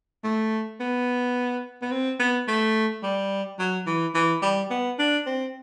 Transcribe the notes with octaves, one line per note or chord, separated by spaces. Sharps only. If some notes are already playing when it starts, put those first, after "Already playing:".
A3
B3
B3
C4
B3
A3
G3
F#3
E3
E3
G3
B3
D4
C4